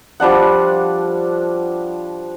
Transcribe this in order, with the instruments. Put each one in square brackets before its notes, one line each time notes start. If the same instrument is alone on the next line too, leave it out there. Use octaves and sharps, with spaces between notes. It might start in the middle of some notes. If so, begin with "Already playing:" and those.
[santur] F3 G3 D4 F#5